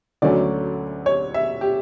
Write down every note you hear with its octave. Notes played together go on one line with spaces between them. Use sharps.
D2 D3 F#3 A3 C#4 D5
C#5
E5
G4